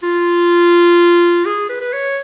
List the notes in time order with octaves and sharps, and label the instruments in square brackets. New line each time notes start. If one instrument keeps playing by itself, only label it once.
[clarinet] F4
G#4
B4
B4
C#5